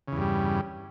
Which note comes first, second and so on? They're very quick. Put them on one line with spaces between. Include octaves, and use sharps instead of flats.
C#3 E2 G2 G3